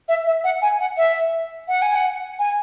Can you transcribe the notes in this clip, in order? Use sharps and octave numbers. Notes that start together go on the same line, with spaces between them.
E5
E5
F#5
G#5
F#5
E5
F#5
G#5
F#5
G#5